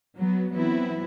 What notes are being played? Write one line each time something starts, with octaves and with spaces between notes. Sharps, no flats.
F#3 B3
E3 F#3 B3 C4 E4